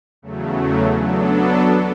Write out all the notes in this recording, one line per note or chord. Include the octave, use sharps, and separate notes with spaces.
E2 C#3 F#3 A3
F#3 B3 D4 A4